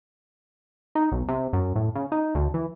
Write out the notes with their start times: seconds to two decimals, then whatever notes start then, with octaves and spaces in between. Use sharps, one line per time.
0.95 D#4
1.12 B1
1.28 C3
1.53 F#2
1.76 A2
1.95 C#3
2.12 D#4
2.35 D2
2.54 E3